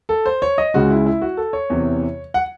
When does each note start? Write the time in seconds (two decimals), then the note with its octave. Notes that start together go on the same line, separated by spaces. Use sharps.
0.09 A4
0.26 C5
0.42 C#5
0.58 D#5
0.74 C#2 C#3 G#3 F#4
0.90 E4
1.06 E4
1.22 F#4
1.37 A4
1.53 C#5
1.70 E2 C3 E3
2.34 F#5